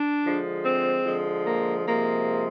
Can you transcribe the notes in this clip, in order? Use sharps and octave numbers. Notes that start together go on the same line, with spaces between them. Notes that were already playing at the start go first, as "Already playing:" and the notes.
Already playing: D4
D3 F3 G#3
C4
D3 F3 G#3
A#3
C3 F3 G#3 A#3